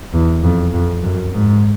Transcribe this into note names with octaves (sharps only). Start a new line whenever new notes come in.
E2
F2
F2
F#2
G#2